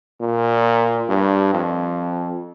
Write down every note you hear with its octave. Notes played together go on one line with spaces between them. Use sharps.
A#2
G2
F2